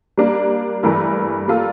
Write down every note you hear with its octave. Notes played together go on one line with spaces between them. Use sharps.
G3 A#3 D4
G2 E3 A3 E4 A#4
G3 A#3 F4 A4